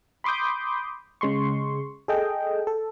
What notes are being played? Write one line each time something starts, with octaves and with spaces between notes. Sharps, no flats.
B5 C6 D6 D#6 G6
C#3 G#3 C6 C#6
G#4 A4 D#5 G5
A4